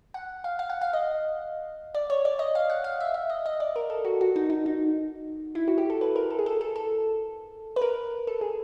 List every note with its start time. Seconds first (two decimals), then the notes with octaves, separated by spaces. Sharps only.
0.14 F#5
0.44 F5
0.59 F5
0.70 F#5
0.81 F5
0.93 D#5
1.95 D5
2.10 C#5
2.25 D5
2.39 D#5
2.55 F5
2.70 F#5
2.84 F5
3.00 E5
3.14 E5
3.30 D#5
3.46 D#5
3.60 D5
3.76 A#4
3.90 A4
4.05 F#4
4.21 F#4
4.36 D#4
4.50 D#4
4.66 D#4
5.55 E4
5.68 F#4
5.78 G4
5.90 A4
6.01 B4
6.16 A#4
6.30 A4
6.39 G#4
6.46 A4
6.61 A4
6.76 A4
7.76 B4
7.81 A#4
8.27 A4
8.41 G#4